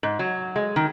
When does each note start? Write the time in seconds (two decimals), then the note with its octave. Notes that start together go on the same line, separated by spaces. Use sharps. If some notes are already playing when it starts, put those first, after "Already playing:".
0.03 G#2
0.19 F#3
0.56 G#3
0.76 D#3